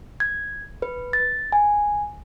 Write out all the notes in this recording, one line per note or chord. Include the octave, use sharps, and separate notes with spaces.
G#6
B4
A6
G#5